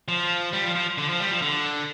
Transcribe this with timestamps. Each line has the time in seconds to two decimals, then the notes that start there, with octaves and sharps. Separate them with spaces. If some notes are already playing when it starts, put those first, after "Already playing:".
0.08 F3
0.53 G3
0.64 F3
0.75 F3
0.98 D3
1.09 F3
1.20 G3
1.31 F3
1.42 D3